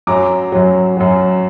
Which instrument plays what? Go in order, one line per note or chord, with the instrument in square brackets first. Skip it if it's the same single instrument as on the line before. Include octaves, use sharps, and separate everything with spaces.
[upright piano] F#2 F#3 A#5 D6
F#2 F#3
F#2 F#3